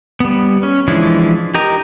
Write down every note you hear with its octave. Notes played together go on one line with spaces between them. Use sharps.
G3 B3
C#4
E3 F3 G#3 D4 E4
G4 A#4 D#5 A#5